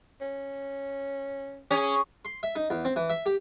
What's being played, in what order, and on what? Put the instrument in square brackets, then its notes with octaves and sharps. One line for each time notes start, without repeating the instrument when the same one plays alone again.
[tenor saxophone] C#4
[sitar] C#4 [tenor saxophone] G#4
[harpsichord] C6
E5
D#4
E2
C4
E3
E5
G4